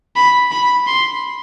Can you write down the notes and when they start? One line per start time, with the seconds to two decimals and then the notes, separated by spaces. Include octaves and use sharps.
0.16 B5
0.51 B5
0.87 C6